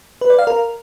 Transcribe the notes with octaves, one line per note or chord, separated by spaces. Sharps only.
B4
D5
F5
A#4